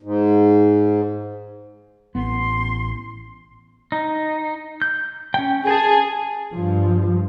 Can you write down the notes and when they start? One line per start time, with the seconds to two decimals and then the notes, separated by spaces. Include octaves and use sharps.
0.03 G#2
2.15 A1 B3 C6
3.92 D#4
4.82 G6
5.34 C#4 G5
5.67 G#4 G#5 A5
6.53 G2 F3